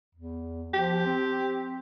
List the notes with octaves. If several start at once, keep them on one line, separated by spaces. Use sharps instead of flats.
E2
F3 G4
C4